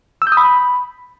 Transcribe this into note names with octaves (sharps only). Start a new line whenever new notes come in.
E6
G6
D#6
B5